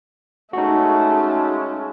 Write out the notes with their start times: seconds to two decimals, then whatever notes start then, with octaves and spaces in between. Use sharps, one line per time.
0.53 C#3 G#3 A3 C#4 D#4 F#4